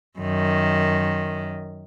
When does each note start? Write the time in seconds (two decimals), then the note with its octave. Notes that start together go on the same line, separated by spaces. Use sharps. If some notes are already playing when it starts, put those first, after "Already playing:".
0.19 F#2 D#3